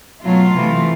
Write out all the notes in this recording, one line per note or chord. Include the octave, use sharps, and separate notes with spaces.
B2 F#3 A3 F4
C3 E3 A3